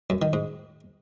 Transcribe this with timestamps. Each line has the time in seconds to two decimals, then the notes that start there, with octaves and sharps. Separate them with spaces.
0.10 F#2
0.22 D#3
0.33 G#2